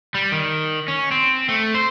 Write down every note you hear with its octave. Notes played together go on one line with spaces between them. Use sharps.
G3
D#3
C#4
C4
A3
C5